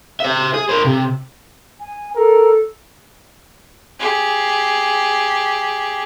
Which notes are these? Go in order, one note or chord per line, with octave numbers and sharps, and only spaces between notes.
C5 E5
G#4
A#4 C5
C3
G#5
A4 A#4
G4 G#4